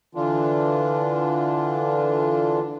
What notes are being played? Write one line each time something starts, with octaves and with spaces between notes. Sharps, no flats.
D3 E3 D4 F4